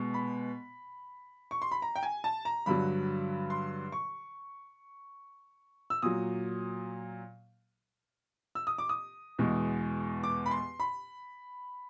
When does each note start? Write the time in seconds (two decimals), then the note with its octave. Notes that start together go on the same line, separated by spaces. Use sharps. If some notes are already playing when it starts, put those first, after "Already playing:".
Already playing: B2 G#3
0.14 B5
1.51 C#6
1.62 C6
1.71 B5
1.82 A#5
1.96 G5
2.03 G#5
2.24 A5
2.45 A#5
2.66 G2 D3 F#3 B5
3.50 C6
3.92 C#6
5.90 E6
6.02 A#2 F#3 D#6
8.55 E6
8.67 D#6
8.78 D6
8.89 D#6
9.39 E2 B2 G#3
10.23 D6
10.46 B5
10.51 C6
10.80 B5